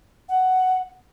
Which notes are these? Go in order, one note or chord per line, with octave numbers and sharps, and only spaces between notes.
F#5